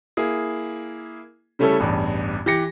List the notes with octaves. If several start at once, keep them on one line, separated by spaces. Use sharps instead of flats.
A#3 E4 G#4
C#3 G3 A3 C#4 E4 A4
A1 E2 G2
E3 G4 A#6 C#7